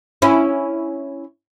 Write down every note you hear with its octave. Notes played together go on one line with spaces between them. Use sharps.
C#4 E4